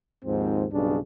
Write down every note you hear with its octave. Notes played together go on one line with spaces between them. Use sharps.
D#2 G#2 F3 C4
B1 G2 C#3 D4